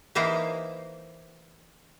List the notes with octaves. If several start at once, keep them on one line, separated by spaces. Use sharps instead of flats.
E3 A#3 D#4 E4 C5 D5